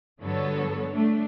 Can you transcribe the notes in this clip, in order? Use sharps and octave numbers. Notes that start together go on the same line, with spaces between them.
G2 D3 F#3 B3 A4 C#5
A3 D4